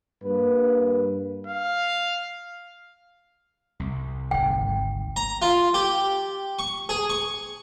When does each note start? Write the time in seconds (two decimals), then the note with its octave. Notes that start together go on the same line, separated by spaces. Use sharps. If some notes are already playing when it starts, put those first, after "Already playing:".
0.23 G2 A#3 B4
1.47 F5
3.80 C2
4.31 G#1 D2 G5
5.16 A#5
5.42 F4
5.74 G4
6.59 C#6
6.89 G#4
7.09 C#6